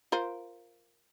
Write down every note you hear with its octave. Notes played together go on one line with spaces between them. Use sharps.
F4 A#4 C5